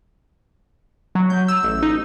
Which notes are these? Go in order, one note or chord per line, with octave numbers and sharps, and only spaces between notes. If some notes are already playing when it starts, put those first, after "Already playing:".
F#3
G6
E6
A1
D#4